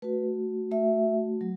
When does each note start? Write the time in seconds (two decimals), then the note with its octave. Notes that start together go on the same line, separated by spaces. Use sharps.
0.02 A3 F#4 B4
0.71 A3 F#4 E5
1.41 F#3